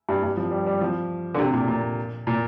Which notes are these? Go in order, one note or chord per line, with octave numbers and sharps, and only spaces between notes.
G2
G2
F3
G3
G3
F3
D3
C3
A#2
A#2
A#2